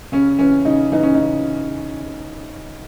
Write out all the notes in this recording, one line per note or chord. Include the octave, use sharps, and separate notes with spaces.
C#3 C#4
E3 C#4
C#3 D#4
E3 D#4
C#4
C#3 D#4